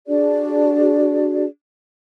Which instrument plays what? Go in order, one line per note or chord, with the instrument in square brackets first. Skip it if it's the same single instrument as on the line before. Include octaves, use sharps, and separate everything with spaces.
[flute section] D4 F#4 G#4 D5